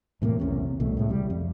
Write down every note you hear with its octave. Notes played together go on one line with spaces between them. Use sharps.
E2 A2 C3 A#3
B1 E2 C3 C#4
C2 B2 A3
A2 G3 G#3
C#2 C3 G3
F2